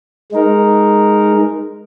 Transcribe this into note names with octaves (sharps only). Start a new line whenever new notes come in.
G#3 D#4 A#4